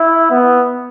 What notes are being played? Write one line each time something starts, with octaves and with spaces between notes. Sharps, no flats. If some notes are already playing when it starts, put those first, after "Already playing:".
Already playing: E4
B3